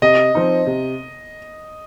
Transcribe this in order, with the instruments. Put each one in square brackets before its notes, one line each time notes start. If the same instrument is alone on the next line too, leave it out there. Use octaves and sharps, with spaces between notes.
[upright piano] C3 [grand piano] D#5
[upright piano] F3 C4 D#4
C3